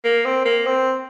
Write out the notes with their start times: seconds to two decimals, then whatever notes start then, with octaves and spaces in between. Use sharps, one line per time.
0.04 A#3
0.25 C4
0.45 A#3
0.66 C4